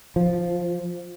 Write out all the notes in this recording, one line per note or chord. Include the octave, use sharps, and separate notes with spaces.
F3